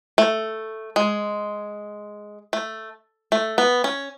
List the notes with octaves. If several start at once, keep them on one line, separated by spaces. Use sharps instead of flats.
A3
G#3
A3
A3
B3
C#4